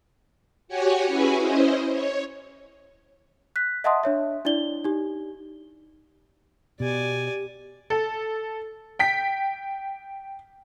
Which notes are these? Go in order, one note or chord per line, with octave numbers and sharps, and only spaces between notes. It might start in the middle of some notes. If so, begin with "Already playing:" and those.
F#4 G4 C#5 F#5 G#5
C#4 E4 F#4 G#4 B4 G#5
C#4 E4 C5 D#5
C#5
F#6 B6
D#5 E5 F#5 A5 C6 D#6
D4 C#5 E5
D4 E4 D5 G7
D#4 G4
B2 G4 D5 G#5
A4
G5 B6